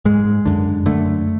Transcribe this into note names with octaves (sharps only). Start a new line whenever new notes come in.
G#2 G#3
F#2 D3
F#2 D3 A3